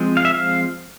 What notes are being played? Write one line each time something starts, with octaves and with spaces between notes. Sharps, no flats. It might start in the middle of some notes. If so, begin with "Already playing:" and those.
Already playing: F3 G#3 C4
F5
E5
F5